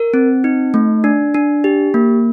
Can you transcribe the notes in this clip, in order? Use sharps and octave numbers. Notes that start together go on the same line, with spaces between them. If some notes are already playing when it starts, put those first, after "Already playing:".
Already playing: A#4
C4
D#4
A3
D4
D4
G4
A#3